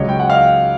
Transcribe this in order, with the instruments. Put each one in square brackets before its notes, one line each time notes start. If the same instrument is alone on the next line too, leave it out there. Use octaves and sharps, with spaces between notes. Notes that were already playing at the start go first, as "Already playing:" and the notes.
Already playing: [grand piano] C#2 C#3 F#3 C#5 D#5
G5
F#5
D#5 F5